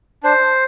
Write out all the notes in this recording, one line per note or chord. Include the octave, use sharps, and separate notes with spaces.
D4 C5